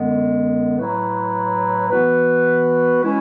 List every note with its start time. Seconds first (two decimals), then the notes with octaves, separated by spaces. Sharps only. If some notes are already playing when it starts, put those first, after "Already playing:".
Already playing: F#2 D3 G#3 B3
0.77 A2 F#3 A3 E4 B4
1.90 E3 B3 F#4 B4
3.01 G#3 C#4 E4